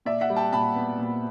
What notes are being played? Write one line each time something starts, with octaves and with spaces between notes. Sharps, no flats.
A#2 D5 E5
E5 F#5
G3
G5 A5
A#2 A5 B5
B3
A#2